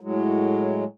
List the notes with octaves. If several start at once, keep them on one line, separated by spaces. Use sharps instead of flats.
A2 F#3 G#3